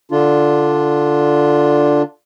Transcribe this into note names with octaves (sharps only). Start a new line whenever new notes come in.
D3 D4 F4